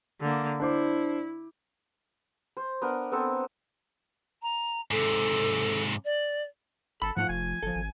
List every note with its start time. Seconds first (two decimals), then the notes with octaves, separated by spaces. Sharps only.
0.20 D3 A#3
0.60 D4 E4 C5 D6
2.57 C5
2.82 B3 D4 A#4
3.12 B3 C4 A4 A#4
4.42 A#5
4.91 G#2 C3 A4
6.05 D5
7.02 G#1 A4 B5
7.16 G#2 F3 A3 F4 F#5
7.29 F1 G#5
7.63 G1 F3 A4
7.75 G#1